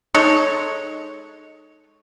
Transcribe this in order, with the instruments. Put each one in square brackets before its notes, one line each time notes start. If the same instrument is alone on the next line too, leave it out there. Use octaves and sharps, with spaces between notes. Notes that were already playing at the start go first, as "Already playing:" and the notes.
[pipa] G#3 D#4 A4 C#5